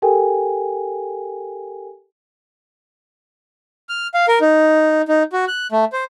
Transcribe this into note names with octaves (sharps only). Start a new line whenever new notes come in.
G4 A4 A#4 G5 G#5
F6
F5
A#4
D#4
D#4
F#4
F#6
A3
C5